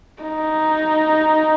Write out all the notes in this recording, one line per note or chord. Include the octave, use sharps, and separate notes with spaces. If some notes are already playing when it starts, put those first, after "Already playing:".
D#4